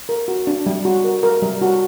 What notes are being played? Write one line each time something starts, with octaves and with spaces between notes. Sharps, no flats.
A#4
F#4
D4
G3
F#4
A#4
A#4
G3
F#4